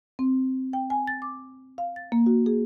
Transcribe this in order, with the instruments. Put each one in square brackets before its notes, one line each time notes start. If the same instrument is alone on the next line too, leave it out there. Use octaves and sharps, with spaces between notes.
[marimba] C4
G5
G#5
A6
D6
F5
A6
A#3
F#4
G#4